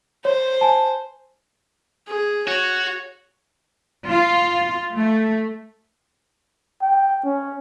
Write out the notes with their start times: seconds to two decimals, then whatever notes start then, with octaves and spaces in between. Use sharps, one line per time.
0.25 C5 C#5
0.61 G#5 A5
2.07 G#4
2.47 F#4 C#5
4.08 F4
4.95 A3
6.82 G5
7.24 C#4